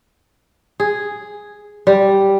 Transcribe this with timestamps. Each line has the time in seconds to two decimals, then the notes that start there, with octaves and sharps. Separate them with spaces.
0.80 G#4
1.87 G3